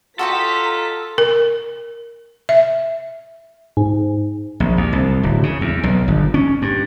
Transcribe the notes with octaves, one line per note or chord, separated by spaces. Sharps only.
F4 F#4 A4 D#5 G5 A#5 B6
A#4
E5
G#2
A#1
D#2
C2
D1
C#3
E2
B1
G1
C#4
G2